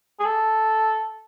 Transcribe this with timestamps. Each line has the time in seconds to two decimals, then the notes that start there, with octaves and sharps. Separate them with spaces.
0.20 G#4
0.25 A4